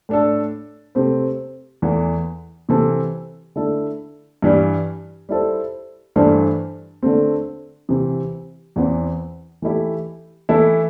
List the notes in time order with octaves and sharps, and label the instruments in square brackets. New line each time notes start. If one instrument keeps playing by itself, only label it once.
[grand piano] A2 A3 D4 A4
C3 A3 C4 G4 C5
E2 E3 A3
C3 E3 C4 A4
D3 A3 E4 A4
G2 E3 G3
G3 E4 A4 C5
G2 E3 A3 D4 C5
D3 A3 C4
C3 E3 C4 G4
E2 E3 C4
E3 A3 E4 G4
E3 A3 E4 A4